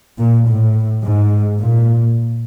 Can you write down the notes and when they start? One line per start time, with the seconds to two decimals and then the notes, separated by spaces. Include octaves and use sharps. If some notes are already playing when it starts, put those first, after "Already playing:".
0.20 A#2
0.48 A2
1.04 G#2
1.60 A#2